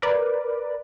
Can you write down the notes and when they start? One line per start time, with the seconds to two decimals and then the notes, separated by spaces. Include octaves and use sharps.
0.02 A#4 B4 D5